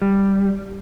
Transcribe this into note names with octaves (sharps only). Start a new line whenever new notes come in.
G3